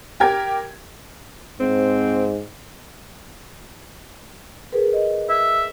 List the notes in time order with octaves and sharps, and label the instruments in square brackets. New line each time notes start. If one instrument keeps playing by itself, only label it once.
[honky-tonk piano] G4 A#4 G#6
[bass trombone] G#2 [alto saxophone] C4
[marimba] G#4 A#4 B4
D#5
[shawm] E5